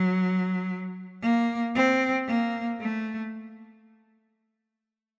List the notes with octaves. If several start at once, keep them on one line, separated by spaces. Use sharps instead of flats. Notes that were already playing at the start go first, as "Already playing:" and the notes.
Already playing: F#3
A#3
C4
A#3
A3